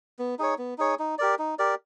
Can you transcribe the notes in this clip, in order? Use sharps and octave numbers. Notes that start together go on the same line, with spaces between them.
B3
D#4 G#4 C#5
B3
D#4 G#4 C#5
D#4
G4 A#4 D5
D#4
G4 A#4 D5